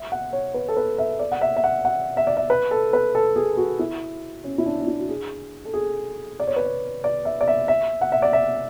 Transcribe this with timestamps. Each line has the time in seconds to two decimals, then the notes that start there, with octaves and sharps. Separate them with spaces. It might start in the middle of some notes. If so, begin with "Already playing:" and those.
Already playing: E5
0.12 F#5
0.33 C#5
0.54 B4
0.69 A4
0.77 B4
0.98 E5
1.19 D5
1.32 F#5
1.41 E5
1.56 E5
1.64 F#5
1.85 F#5
2.17 E5
2.27 D5
2.37 E5
2.50 B4
2.71 A4
2.93 B4
3.15 A4
3.36 G#4
3.57 F#4
3.79 E4
4.44 C#4
4.58 E4
4.66 D4
4.81 D4
4.87 E4
5.00 F#4
5.09 G#4
5.65 A4
5.73 G#4
6.40 D5
6.47 C#5
6.56 B4
6.65 C#5
7.04 D5
7.25 E5
7.41 D5
7.48 E5
7.68 E5
8.01 F#5
8.12 E5
8.22 D5
8.33 E5